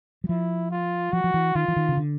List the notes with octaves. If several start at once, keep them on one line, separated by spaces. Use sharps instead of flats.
F#3
F3 E4
F4
F3 F#4
F3
E3
D#3 F4
E3
D#3
C#3
D3